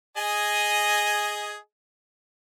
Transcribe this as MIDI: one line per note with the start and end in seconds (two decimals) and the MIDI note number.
0.17 1.57 68
0.17 1.57 75
0.17 1.57 80